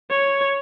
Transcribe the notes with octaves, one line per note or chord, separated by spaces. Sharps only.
C#5